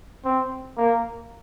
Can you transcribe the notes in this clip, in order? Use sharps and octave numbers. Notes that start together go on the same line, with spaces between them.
C4
A#3